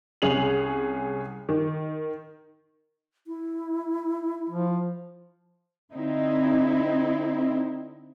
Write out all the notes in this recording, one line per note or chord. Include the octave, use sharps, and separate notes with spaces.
C2 C#4 G#4 F7 F#7
D#3
E4
F3
D3 C4 D#4 E4